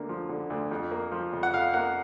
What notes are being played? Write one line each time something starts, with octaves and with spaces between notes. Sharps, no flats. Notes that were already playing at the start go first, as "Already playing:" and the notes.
Already playing: D2 D3 A#3
F3
D3
D2
F2
A#3
F3
F2
F#5
F2 F5
A#3 F#5